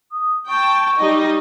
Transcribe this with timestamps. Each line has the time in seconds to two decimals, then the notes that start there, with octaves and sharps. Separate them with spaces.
0.12 D#6
0.48 G5 A5 C#6
0.98 G3 D#4 D#5